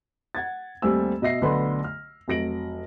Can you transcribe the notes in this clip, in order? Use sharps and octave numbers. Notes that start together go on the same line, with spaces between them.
F#5 G#6 A6
D#2 G3 A3 C4 G#5 E6
B2 D#5 E5 A#6 C7
B1 D3 A3 B4 B5 C6
F6
F1 F#3 A#6 D7 F#7